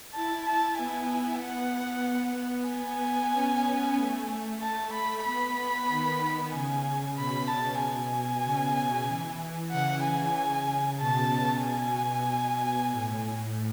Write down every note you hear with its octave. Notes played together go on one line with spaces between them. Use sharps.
E4 A5
E4 A5
B3 G#5
F#5
B3 G#5
C#4
B3
A3
A3
A3 A5
B5
B3 B5
D#3
C#3 G#5
B2 B5
A5
G#5
C#3
E3
C#3 F#5
G#5
B2 A5
G#5
B2
A2